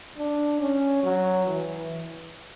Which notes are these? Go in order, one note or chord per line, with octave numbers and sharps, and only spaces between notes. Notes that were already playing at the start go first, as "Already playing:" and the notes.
D4
C#4
F#3
E3